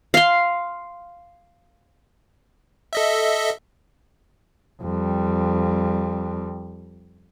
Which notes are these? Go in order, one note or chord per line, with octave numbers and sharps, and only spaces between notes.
F5 C6
A4 D#5 E5
F2 G3